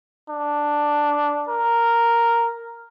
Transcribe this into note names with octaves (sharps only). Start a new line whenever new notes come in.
D4
A#4